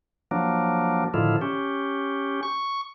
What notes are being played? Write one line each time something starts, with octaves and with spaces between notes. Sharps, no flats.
F3 F#3 A#3 D4
A2 D3 D#3 F3 E4 F4
C#4 G4
C#6